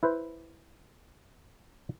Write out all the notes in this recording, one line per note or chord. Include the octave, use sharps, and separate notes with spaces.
E4 B4 C5